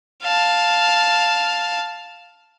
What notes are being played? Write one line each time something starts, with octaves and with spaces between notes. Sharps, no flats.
F5 A5